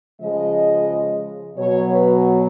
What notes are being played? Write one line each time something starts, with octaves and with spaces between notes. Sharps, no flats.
C#3 F3 G#3 D#5
B2 F#3 C#5
B4